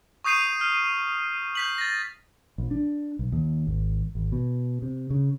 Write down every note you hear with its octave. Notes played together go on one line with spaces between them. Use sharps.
C#6 D#6 G6 C7 D#7 F7
F6
G6 B6 F#7
A6 A#6
A#1
D4
B1
D#2
G#1
G#1
B2
C3
C#3